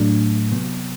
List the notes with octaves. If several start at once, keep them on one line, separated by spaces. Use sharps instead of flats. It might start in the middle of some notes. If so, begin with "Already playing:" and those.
Already playing: A2 F#3 A3 D4
C3 F#3 B3